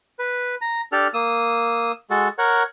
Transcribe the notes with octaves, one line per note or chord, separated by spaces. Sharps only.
B4
A#5
D4 G4 A4 F6
A#3 D#6 E6
G#3 F#4 A4
A#4 C#5 F#5